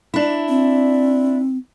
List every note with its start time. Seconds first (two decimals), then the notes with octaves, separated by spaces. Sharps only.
0.14 D4 E4
0.49 C4